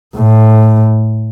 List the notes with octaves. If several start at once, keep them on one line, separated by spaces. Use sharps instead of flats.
A2